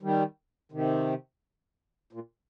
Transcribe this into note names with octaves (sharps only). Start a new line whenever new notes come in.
D#3 G3
C3 D#3
A#2